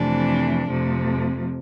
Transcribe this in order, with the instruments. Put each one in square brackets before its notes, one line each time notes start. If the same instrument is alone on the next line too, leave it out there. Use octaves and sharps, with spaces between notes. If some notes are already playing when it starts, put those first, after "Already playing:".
Already playing: [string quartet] F2 C3 E3 A3 D4
F2 C3 F3 A3